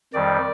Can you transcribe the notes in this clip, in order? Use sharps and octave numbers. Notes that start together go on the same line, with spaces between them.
F2 D#3 G3 D5